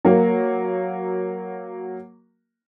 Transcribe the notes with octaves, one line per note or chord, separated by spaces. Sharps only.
F#3 A#3